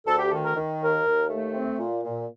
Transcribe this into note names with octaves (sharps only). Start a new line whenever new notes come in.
D2 A4
G4
D#3 A4
A#4
D#3
D#2 A#4
D#2
A3
C4
A#2
A#2